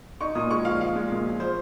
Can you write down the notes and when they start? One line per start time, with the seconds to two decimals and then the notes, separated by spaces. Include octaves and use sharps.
0.21 D#4 C#6
0.35 A#2 D#6
0.50 G#3 C#6
0.65 F3 F5
0.80 F3 F5
0.96 G#3
1.10 A#2
1.25 F3
1.40 C5